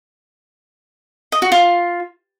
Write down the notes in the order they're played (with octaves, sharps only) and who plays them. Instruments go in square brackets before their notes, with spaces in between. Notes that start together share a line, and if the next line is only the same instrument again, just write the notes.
[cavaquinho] D#5
F#4
F4